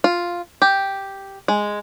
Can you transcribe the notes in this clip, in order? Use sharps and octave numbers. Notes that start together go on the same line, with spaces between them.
F4
G4
G#3